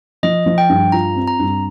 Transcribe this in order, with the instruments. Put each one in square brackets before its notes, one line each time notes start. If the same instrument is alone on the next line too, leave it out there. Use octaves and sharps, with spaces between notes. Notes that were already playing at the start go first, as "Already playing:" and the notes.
[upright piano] F3 [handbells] D#5
[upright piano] F3
[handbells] G5
[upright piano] G2
[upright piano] F4 [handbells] A#5
[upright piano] C4
[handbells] A#5
[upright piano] G2